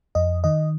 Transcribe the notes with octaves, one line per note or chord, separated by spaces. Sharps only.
F2 D#5
D#3 D#5